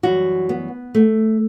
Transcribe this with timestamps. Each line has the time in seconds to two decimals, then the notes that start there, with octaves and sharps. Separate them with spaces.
0.03 F#2 E3 G3 F#4
0.49 B3
0.95 A3